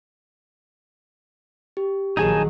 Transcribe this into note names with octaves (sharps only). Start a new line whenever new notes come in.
G4
A#1 D#3 F#3 D#4 G#4 G#5 A5